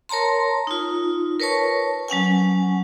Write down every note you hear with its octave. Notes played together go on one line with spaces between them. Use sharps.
A#4 C#5 A5 A#5 C6
D#4 F4
A#4 B4 C#5 A5 C#6
F#3 C#4 F#5 G#5